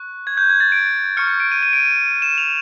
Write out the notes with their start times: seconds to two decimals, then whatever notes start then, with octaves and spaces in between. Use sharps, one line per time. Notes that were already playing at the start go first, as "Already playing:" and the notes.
Already playing: C#6 F#6
0.27 G#6
0.37 G6
0.50 G#6
0.60 A6
0.72 D7
1.17 C#6 F6 C#7
1.28 C#7
1.40 D7
1.52 D#7
1.63 D#7
1.73 D7
1.85 D#7
2.08 D#7
2.22 E7
2.38 F7